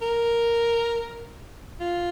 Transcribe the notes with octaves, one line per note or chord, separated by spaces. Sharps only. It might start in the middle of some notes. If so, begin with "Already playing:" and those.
A#4
F4